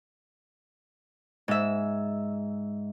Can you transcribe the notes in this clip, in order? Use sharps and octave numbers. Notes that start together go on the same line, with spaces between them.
G#2 E5